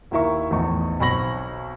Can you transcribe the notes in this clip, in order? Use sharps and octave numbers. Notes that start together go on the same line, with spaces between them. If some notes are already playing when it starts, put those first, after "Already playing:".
D#2 D#3 E4 A#4 E5 C#6
A1 E2 A2 F3 D#4 C#6
B1 C4 B5 C#6 A#6 F#7